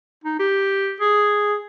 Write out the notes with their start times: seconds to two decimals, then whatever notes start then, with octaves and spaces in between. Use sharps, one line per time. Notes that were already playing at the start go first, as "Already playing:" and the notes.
0.24 D#4
0.40 G4
1.00 G#4